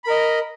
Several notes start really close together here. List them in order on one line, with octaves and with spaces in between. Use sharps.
B5 A#4 D#5